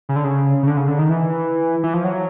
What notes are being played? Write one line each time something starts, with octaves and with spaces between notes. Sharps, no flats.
C#3
D3
C#3
C#3
D3
C#3
D3
D#3
E3
E3
F3
F#3